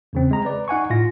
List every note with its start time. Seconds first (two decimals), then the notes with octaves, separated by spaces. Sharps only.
0.13 E2 C#3 C4
0.31 G#3 A#5
0.45 B4 D5
0.68 D#4 F#5 G#5 C#6
0.90 A2 F4 A#6